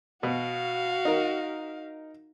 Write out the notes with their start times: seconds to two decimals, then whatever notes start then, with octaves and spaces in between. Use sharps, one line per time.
0.23 B2 F#4 F5
1.05 D#4 A#4